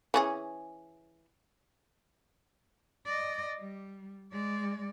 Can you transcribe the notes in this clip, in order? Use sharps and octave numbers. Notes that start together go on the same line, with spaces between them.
E3 C#4 G#4
D5 D#5
G3
G#3 D5